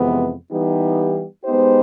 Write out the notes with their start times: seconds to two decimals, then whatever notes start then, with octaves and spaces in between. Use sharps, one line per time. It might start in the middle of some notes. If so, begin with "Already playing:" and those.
Already playing: F2 C3 E3 G#3 B3
0.52 E3 G3 B3 D#4 G4
1.45 G#3 B3 D#4 G4 C5